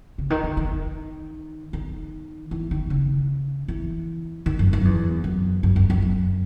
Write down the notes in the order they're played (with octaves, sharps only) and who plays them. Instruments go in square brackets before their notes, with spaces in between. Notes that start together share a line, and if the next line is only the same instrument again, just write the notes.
[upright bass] C#3
D#3
D#3
D#3
D#3
E3
D#3
C#3
E3
D#3
F#2
F#2
E2
F#2
F#2
F#2
F#2
F#2